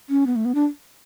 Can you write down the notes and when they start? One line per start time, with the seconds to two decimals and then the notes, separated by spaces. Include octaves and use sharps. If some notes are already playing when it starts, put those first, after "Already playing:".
0.09 C#4
0.27 B3
0.36 A3
0.45 B3
0.55 D4